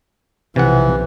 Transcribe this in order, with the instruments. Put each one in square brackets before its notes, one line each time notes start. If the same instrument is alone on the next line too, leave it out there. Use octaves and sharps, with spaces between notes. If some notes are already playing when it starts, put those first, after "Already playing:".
[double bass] B1 F3 [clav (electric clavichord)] C3 F#5 [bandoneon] E3